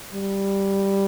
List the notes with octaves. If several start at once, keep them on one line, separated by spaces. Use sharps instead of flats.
G3